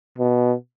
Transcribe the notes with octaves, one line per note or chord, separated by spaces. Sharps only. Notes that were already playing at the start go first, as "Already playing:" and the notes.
B2